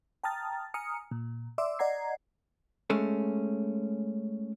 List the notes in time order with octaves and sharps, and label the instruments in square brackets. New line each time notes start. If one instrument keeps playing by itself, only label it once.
[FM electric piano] G5 A5 A#5 D#6 F6 A6
G#5 A#5 D#6 F6 C#7
A#2
D5 E5 C6 D6 E6
D5 D#5 F#5 A#5 G#6 C7
[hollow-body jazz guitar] G#3 A3 C#4